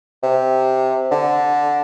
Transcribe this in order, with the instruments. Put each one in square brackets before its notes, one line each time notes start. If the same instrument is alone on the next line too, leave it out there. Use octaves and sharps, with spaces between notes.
[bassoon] C3
D3